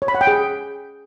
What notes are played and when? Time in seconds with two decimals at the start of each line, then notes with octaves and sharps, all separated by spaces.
0.02 C#5
0.08 B5
0.15 F#5
0.21 G5
0.27 G#4